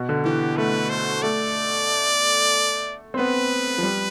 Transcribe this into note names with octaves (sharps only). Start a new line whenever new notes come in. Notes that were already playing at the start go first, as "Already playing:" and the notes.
Already playing: B2
D3
E3 G4
A3 B4
C5
A3 D5
C4
B3 B4
F3
G3